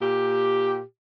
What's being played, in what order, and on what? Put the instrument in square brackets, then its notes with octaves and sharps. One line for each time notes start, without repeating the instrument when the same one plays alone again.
[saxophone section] A#2 G4